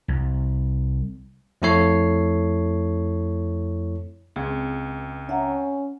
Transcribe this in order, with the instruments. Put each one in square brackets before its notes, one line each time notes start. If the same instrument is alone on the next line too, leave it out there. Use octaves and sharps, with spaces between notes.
[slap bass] C2
[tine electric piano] F2 A3 E4 A4 C#5 C7
[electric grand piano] C#2 [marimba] C4 G#4
[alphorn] C#4 [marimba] E5 F#5 A#5